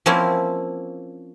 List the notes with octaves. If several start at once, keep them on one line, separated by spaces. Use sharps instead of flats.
F3 A#3 C4 C#4 E4 C#5